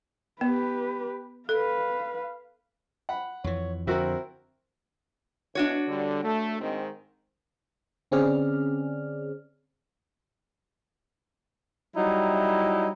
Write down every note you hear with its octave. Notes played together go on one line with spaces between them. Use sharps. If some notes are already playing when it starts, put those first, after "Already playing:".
B3 G4 B4
A4 B4 F5
F#5 B5
F2 E3 C#5
F2 D3 C4 E4 F#4 A#4
B2 E3 D4 F#4 C#5
D3 G3
A3
G#2 D#3 C4
D3 C4 C#4 G#4 D5 F6
F#3 G3 D#4 E4